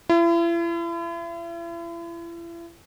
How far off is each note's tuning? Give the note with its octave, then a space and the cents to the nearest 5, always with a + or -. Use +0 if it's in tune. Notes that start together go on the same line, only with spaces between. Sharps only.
E4 +40